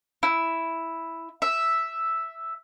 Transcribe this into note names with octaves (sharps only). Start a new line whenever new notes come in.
E4
E5